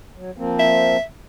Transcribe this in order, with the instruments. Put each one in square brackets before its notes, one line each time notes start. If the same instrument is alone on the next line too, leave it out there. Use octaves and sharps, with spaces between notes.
[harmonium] F#3
F3 A#3 C4
[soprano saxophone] E5